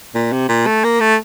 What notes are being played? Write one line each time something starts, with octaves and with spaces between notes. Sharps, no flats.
A#2
C3
A#2
A3
A#3
A3